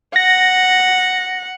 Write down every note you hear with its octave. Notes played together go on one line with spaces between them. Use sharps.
F#5 A#6